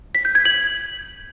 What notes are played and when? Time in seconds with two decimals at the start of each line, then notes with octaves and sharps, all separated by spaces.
0.15 B6
0.25 G6
0.35 G#6
0.45 F#7